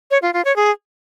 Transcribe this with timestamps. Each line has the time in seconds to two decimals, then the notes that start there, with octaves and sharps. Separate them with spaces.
0.11 C#5
0.22 F4
0.34 F4
0.45 C#5
0.56 G#4